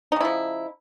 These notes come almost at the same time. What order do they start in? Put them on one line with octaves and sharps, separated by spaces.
D#4 C#3 E4 F3